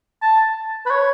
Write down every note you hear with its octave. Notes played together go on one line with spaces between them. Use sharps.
A5
B4
C#5